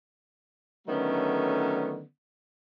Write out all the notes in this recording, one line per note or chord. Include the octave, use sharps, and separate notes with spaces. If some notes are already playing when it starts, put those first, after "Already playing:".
D3 D#3 F#3 A3 B3 C#4